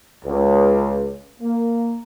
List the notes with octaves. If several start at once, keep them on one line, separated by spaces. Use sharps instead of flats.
C#2
A#3